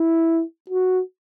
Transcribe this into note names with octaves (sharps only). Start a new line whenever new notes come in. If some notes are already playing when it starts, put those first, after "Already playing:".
Already playing: E4
F#4